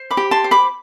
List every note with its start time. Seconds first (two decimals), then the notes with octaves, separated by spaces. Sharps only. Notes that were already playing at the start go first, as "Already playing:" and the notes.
Already playing: C5
0.11 B5 D6
0.17 G4
0.31 A5 C6
0.44 C5
0.51 B5 D6